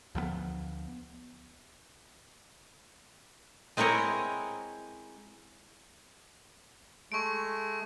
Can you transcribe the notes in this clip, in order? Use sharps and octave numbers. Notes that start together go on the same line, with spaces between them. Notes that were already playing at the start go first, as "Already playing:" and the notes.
D2 F3 F#3 B3
G#3 C4 E4 A#4 C#5 D#5
G#3 A3 C#6 D7